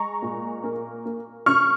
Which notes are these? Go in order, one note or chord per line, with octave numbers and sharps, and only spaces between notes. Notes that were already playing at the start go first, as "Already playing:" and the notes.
Already playing: G#3 A#5 C#6
A#2
A#3
A#3
C#3 C#6 F6